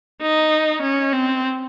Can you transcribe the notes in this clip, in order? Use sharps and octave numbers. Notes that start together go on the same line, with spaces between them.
D#4
C#4
C4